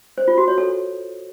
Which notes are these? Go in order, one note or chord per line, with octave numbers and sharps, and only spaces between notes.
C5
F4
F#4
C#5
A4